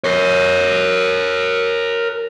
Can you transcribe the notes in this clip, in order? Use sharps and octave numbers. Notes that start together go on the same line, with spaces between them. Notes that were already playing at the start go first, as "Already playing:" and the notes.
A#4 C#5